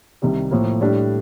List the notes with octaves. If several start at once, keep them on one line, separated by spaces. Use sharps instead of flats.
C2 C3 D#3 G3
A2 F3 A#3
A2 G3 D4